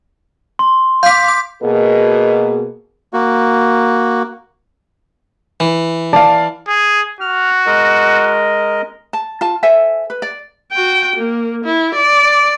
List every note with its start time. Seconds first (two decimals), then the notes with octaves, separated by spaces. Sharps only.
0.59 C6
1.03 F5 D6 G6 B6
1.28 D6
1.63 B2 A#3 G#4
3.13 A#3 F#4
5.60 E3
6.13 D5 F5 A5
6.68 G#4
7.21 F#4 F6
7.66 G#3 A#4 D#5
9.13 A5
9.41 F4 A5
9.63 A4 C5 E5 G#5
10.10 B4
10.22 D5
10.72 F#4 G5
11.16 A#3
11.65 E4
11.96 D5